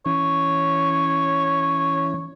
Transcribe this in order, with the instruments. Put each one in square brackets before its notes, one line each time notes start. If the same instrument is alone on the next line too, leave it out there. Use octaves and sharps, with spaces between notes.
[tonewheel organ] E3 C#4 [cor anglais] C#5